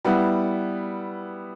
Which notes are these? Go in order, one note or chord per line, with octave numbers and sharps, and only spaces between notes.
G3 B3 E4